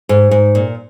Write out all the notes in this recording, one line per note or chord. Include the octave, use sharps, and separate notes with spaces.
G#2
G#2
A#2